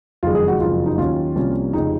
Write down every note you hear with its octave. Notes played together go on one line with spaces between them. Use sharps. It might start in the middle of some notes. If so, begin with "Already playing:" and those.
F#1 F2 D#3 G#3 F4
G#4
F#4
F#1 F2 C#3 F3 F4
D#4
D#2 D#3 F#3 C#4 F4
C2 C3 F3 A#3 C#4
F1 F2 C#3 D#4